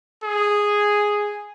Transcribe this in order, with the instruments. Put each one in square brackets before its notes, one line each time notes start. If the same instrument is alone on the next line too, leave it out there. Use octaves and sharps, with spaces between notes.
[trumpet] G#4